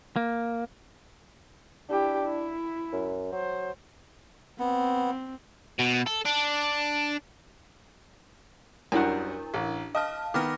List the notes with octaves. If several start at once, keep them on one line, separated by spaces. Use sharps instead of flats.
A#3
D4 E4 G4
E4
F#2
F#3 C5
B3 C4
B2
A4
D4
F#2 G3 D4 E4 A#4 F#5
A1
D#5 F5 A5 F6
D#3 B3 D6 F6 A#6